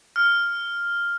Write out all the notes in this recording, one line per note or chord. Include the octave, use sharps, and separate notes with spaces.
F6